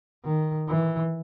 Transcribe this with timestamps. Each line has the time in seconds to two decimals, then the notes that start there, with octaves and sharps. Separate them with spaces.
0.25 D#3
0.69 E3